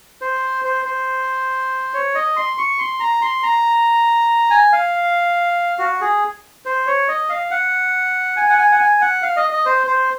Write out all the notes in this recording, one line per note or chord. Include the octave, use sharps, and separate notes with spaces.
C5
C5
C5
C#5
D#5
C6
C#6
C6
A#5
C6
A#5
G#5
F5
F#4
G#4
C5
C#5
D#5
F5
F#5
G#5
F#5
G#5
F#5
G#5
F#5
F5
D#5
D#5
C5
C5